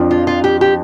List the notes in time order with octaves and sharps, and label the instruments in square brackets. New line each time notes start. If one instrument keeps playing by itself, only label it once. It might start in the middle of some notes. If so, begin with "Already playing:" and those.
Already playing: [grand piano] F2 F3 D4
[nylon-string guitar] F4
F4
G4
G4